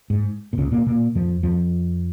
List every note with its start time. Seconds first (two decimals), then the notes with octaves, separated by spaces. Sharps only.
0.10 G#2
0.53 A#2
0.58 C#2 C#3
0.72 A#2 A#3
0.87 A#2 A#3
1.15 F2 F3
1.43 F2 F3